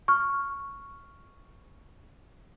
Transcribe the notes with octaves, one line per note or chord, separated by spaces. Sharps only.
C#6 F6